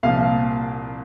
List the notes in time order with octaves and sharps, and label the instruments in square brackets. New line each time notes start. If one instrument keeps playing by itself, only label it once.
[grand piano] C2 A#2 F3 F5